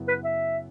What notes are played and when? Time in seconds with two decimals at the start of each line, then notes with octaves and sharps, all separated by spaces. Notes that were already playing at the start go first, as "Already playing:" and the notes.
Already playing: F#2 C#3 F#3 B3 E4
0.08 B4
0.25 E5